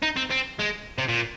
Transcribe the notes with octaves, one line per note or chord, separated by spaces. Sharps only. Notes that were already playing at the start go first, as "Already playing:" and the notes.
D#4
C4
C4
G#3
C3
A#2